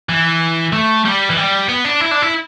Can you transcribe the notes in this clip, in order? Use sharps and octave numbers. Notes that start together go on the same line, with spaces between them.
E3
A3
G3
E3
G3
B3
D4
E4
D4
E4